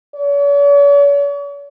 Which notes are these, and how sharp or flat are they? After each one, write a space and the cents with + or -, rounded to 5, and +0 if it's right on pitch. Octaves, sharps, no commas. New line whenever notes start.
C#5 +45